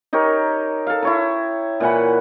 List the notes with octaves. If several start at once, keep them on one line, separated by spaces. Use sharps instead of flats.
D#4 G4 A#4 C#5
A4 F5
E4 C#5 A#5
A#2 E3 F#5 B5